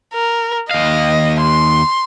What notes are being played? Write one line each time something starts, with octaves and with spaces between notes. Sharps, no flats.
A#4
D#2 D#5 F5
C6